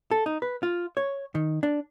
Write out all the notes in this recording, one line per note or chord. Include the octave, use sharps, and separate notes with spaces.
A4
D#4
B4
F4
C#5
D#3
D4